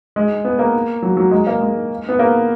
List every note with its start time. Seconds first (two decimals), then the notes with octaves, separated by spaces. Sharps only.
0.16 G#3
0.45 B3
0.59 A#3
1.02 F#3
1.17 F#3
1.31 G#3
1.47 A#3
1.61 G#3
2.09 B3
2.19 A#3